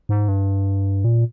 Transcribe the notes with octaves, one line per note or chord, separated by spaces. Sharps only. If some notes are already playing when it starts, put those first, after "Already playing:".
G#2
G2
A#2